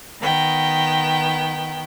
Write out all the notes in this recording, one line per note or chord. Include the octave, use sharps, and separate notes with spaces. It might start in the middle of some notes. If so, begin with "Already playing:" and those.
D#3 B3 G5